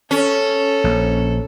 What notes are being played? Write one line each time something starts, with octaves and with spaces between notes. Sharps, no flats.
C#4 A4
A#1